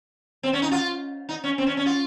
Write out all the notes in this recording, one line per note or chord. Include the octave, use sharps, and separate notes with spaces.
C4
C#4
D#4
F4
D#4
C#4
C4
C#4
C#4
F4